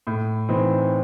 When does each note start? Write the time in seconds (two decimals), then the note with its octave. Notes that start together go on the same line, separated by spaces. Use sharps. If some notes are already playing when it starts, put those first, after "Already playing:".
0.07 A2
0.48 E3 C4 D#4